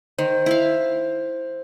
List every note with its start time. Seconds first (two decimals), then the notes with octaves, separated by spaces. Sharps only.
0.18 D#3 C5
0.46 E4 E5 F5